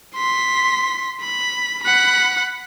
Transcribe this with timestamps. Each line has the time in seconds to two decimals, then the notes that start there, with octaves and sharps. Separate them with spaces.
0.16 C6 B6
1.21 B5
1.83 F#5 B5